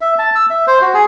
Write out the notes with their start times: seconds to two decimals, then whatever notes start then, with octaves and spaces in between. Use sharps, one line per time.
0.01 E5
0.19 A5
0.35 E6
0.50 E5
0.67 C5
0.81 F#4
0.94 G#4